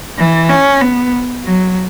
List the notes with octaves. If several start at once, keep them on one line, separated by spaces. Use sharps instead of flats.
E3
C#4
B3
F#3